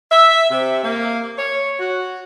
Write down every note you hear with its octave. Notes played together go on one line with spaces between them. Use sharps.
E5
C3
A#3
C#5
F#4